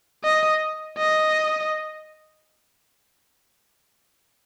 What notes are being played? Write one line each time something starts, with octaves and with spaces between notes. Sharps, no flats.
D#5
D#5